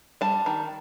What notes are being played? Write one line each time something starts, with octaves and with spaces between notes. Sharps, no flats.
G3 A5
D#3